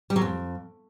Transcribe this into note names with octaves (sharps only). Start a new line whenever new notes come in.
G3
F#3
F2